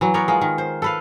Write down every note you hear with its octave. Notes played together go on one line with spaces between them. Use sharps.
E3 F#3
B3 A#4 C#5 D5
G#3 F4
D#3
C5
A4 B4 F5